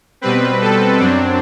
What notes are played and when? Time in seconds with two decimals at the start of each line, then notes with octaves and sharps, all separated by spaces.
0.21 B2 G3 C4 B4
0.61 A4
1.00 F#2 F#3 C4 D4